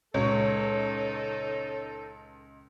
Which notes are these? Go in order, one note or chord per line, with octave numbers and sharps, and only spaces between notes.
C#2 A#2 G#3 D#4 F#4 A4 C#5